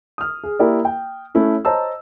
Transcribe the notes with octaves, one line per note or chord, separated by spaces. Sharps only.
D#6 F6
G#4
A#3 E4 G4 A#4 D5
G5
A3 C#4 E4 A4
C5 C#5 D#5 A5 A#5 E6